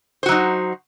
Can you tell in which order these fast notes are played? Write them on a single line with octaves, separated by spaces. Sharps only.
C5 F#4 F#3 D#4